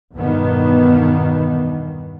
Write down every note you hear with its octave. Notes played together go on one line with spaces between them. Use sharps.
E2 G2 B2 D#3 B3